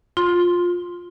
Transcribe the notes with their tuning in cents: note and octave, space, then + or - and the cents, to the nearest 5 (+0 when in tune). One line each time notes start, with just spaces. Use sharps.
F4 +15 C6 +0